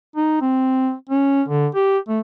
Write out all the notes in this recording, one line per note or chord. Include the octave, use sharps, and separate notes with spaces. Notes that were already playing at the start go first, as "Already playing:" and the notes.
D#4
C4
C#4
D3
G4
A3